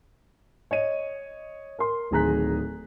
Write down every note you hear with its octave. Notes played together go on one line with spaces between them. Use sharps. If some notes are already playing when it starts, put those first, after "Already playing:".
C#5 D#5 D#7
A#4 C6
D1 D#3 G#4 A#5 F#6 B6